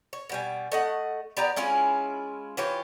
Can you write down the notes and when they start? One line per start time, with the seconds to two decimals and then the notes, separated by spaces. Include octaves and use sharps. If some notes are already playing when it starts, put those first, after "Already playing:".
0.13 C#5
0.29 B2 G3 G#5
0.72 A3 D#5 F#5
1.37 B3 G4 D5 A#5
1.56 G#3 C#4 E4 F4
2.57 E3 F4 G4 C#5